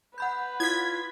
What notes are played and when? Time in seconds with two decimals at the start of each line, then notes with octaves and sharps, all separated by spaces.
0.18 B4 F#5 B5 G6
0.60 E4 F4 G#6 B6